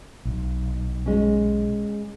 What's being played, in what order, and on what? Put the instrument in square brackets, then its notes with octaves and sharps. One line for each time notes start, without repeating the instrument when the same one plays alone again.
[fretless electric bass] B1
[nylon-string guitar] G#3 C#4